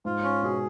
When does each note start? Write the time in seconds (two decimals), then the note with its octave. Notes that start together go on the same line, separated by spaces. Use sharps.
0.05 G#2 F4
0.24 C#4
0.43 B2 G#4